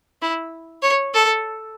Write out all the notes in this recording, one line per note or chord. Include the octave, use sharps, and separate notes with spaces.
E4
C#5
A4